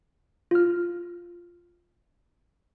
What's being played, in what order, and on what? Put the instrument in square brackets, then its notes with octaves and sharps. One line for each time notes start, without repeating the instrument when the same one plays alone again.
[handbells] F4 F6